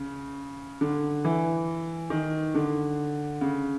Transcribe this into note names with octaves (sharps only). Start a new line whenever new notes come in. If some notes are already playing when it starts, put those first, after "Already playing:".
Already playing: C#3
D3
E3
D#3
D3
C#3